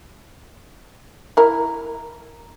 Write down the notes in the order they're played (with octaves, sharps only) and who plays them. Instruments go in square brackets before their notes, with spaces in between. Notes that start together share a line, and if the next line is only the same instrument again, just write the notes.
[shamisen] E4 A#4